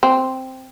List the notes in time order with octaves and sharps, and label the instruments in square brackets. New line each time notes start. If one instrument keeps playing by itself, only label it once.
[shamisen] C4